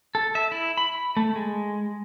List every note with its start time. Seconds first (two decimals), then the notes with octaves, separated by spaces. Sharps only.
0.15 A4
0.35 E5
0.52 E4
0.77 B5
1.17 A3
1.35 G#3